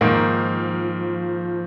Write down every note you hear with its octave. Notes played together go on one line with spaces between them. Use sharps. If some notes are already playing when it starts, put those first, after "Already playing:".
G#2 D#3 F3 A#3